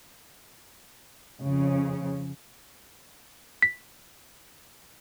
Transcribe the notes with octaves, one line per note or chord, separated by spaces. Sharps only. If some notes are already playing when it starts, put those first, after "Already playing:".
F2 C#3
B6